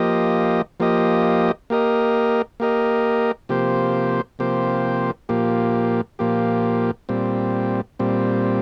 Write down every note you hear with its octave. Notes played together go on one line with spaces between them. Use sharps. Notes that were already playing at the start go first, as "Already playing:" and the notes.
Already playing: F3 A#3 G4 D#5
F3 A#3 G4 D#5
A#3 G4 A#4 D#5
A#3 G4 A#4 D#5
C3 F3 A#3 G4 C5
C3 F3 A#3 G4 C5
A#2 F3 A#3 G4
A#2 F3 A#3 G4
A#2 G3 C4
A#2 G3 C4